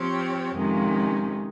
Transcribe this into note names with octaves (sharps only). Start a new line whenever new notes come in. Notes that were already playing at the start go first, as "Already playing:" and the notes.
Already playing: F3 C4 G4 C#5
F2 C3 D#3 G#3 C#4